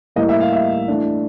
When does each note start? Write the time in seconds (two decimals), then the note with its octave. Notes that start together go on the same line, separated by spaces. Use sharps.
0.16 A2 E3 G3 A#3 D#5
0.29 E5
0.40 F5
0.52 E5
0.88 E3 A3 D4